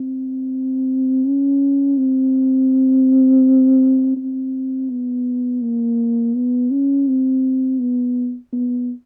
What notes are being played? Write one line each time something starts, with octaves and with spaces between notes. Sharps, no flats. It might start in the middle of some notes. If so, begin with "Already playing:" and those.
Already playing: C4
C#4
C4
C4
B3
A#3
B3
C#4
C4
B3
B3